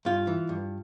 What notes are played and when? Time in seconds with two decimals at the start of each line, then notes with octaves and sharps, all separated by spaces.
0.05 G2 F4
0.27 E3
0.49 G2